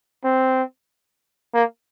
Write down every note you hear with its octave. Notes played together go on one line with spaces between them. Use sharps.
C4
A#3